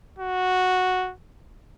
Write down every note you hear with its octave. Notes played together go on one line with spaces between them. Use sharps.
F#4